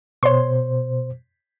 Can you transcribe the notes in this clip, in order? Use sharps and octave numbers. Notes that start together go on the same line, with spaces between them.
B2 C5 C#5 C6